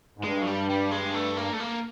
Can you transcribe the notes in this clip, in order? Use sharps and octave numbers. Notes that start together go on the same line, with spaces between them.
G#2
G2 G#3
F#3
G3
G3
G#3
A3
A#3
A3
A#3